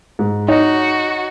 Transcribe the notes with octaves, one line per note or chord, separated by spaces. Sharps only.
G#2
D#4 F#4 C#5